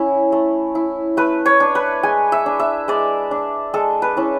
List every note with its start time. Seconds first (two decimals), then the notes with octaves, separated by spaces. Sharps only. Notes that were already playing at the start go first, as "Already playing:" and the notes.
Already playing: C#4 E4
0.32 A3
0.75 E4
1.17 A3 B4
1.46 C#5
1.60 D4
1.75 B4
2.03 G#3 G#5
2.32 E5
2.46 D4
2.59 E5
2.88 G#3 D5
3.31 D4
3.74 G#3 A4
4.02 B4
4.17 C#4 E4